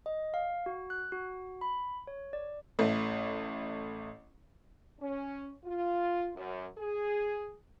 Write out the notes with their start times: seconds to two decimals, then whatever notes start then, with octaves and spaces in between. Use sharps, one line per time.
0.06 D#5
0.34 F5
0.66 F#4
0.90 F#6
1.12 F#4
1.61 B5
2.07 C#5
2.33 D5
2.79 A1 A3
5.01 C#4
5.65 F4
6.35 F#2
6.78 G#4